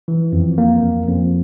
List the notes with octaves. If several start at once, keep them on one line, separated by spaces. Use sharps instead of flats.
E3
F2
A#3
F2
F2